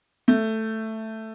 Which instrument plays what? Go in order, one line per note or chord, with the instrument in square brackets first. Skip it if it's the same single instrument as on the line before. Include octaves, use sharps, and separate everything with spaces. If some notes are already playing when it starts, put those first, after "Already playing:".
[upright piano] A3